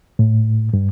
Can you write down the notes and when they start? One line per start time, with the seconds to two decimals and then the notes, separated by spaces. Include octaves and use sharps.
0.19 A2
0.73 G2